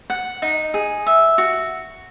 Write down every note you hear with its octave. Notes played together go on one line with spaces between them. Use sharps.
F#5
D#4
G#4
E5
F#4